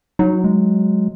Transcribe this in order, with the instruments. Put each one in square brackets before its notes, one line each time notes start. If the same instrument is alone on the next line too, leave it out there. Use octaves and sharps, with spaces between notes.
[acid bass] F#3 [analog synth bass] D#4
[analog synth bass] G#3